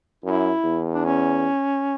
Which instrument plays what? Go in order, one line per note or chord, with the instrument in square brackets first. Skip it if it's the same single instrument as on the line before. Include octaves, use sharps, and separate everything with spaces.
[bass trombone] F#2 [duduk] E4
[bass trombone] E2
[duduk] D4
C#4